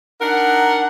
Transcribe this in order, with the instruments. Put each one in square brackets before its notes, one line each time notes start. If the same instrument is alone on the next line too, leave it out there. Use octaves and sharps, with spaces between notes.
[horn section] D4 D#4 A#4 F#5